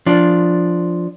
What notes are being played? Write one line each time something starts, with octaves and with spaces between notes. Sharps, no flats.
F3 D4